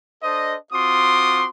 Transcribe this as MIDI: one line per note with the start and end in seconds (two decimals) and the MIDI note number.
0.23 0.55 62
0.23 0.55 69
0.23 0.55 72
0.23 0.55 75
0.73 1.47 60
0.73 1.47 65
0.73 1.47 66
0.73 1.47 84
0.73 1.47 86
0.73 1.47 87